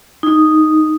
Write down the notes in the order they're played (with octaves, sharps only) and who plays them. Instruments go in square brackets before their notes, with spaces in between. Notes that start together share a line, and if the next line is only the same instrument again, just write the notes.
[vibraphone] D#4